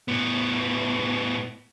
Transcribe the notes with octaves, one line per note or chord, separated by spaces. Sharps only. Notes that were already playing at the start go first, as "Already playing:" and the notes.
A2 B3